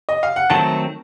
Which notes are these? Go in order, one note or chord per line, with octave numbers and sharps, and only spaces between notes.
D#5
F5
F#5
D#3 F#3 A3 C4 A5